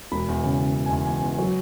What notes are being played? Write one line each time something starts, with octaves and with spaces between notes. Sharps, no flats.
E1 B5
E2
C#3
C#3
C#3
G#5
E2
G#5
E2 G#5
E2
F#3